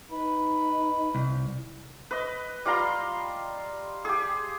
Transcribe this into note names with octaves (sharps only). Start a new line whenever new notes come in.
D#4 B4
C2
B4 D#5
G3 F4 A#5 C6
G4 G#4